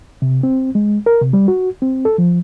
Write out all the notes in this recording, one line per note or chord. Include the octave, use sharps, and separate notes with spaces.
C3
C4
G#3
A#4
C3
G3
F#4
C4
A4
F3